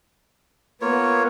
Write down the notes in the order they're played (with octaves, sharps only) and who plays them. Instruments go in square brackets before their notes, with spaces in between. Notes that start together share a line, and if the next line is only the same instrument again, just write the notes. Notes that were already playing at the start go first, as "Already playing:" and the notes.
[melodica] A#3 F4 C#5 [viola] B3